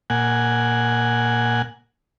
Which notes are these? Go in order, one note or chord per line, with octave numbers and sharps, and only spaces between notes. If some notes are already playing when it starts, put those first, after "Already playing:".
A#2 F#5 G#5